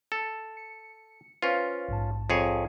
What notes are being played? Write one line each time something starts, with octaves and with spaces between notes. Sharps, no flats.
A4
C#7
C#4 F4 B4 C5 F5
A#1 G#2 A5
F2 G#4 C#5